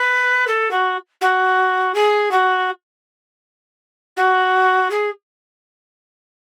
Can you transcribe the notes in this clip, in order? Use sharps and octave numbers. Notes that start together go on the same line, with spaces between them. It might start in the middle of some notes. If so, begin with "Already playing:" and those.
Already playing: B4
A4
F#4
F#4
G#4
F#4
F#4
G#4